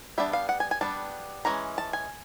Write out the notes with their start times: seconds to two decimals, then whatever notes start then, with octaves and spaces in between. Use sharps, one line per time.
0.18 G3 B3 D4 E5
0.33 F5
0.49 F#5
0.60 G#5
0.71 G#5
0.81 G3 B3 D4 A5
1.45 E3 G#3 C#4 A#5
1.78 A5
1.93 G#5